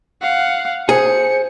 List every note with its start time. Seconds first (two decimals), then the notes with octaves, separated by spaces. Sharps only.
0.22 F5 F#5
0.89 G#4 C5 C#7